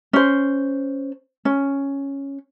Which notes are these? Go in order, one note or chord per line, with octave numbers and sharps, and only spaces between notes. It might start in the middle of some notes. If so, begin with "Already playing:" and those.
C#4 C5
C#4